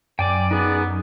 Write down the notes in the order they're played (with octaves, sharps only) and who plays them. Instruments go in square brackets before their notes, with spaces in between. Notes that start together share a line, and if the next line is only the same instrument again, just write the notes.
[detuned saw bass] F#2 [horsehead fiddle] D5 [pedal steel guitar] G5 G#5 D6
[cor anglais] B3 [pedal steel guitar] D#4 G#4 G#5